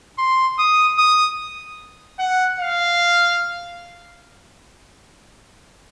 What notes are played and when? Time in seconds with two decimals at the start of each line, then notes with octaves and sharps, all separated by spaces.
0.19 C6
0.59 D#6
0.99 D#6
2.19 F#5
2.60 F5